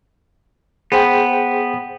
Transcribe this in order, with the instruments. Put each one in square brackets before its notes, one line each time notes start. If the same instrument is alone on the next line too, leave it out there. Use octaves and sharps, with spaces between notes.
[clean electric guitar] B3 [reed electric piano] G#4 C5 G5